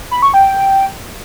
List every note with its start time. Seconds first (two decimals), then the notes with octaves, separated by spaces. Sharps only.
0.11 B5
0.22 C#6
0.34 G5